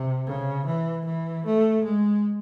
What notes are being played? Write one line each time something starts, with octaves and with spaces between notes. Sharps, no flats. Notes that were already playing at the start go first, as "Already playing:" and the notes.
Already playing: C3
C#3
E3
E3
A3
G#3